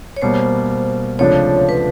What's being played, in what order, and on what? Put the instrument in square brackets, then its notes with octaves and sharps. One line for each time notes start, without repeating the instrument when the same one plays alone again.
[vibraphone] C#5
[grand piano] B2 G3 A#3 [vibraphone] C5
[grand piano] C#2 C3 F3 A3 D4 [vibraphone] C#5
[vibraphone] B4